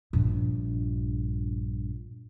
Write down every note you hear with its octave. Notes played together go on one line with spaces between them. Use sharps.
A#1 G2